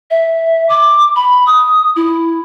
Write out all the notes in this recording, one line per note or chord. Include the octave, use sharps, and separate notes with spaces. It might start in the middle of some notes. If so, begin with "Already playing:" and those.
E5
D6
B5
D#6
E4